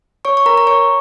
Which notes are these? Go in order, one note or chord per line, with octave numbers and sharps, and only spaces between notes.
C#5 C#6
C#6
A#4 A#5
A#5
C#5 C#6